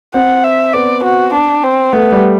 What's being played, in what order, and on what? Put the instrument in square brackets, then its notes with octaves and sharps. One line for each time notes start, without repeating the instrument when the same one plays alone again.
[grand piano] C4 [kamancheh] F#5
[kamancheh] E5
[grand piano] B3 [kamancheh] D5
[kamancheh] F#4
D4
C4
[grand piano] A3 [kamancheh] B3
[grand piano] G3